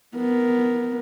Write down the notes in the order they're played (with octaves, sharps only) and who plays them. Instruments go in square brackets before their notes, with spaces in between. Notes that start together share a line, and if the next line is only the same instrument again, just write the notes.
[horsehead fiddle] B3 A#4